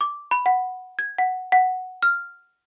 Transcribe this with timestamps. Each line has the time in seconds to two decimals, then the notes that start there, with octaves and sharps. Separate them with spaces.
0.01 D6
0.31 B5
0.46 F#5
0.99 G#6
1.18 F#5
1.52 F#5
2.03 F6